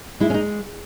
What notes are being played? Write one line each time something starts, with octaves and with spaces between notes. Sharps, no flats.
G#3 E4
C#4
D#4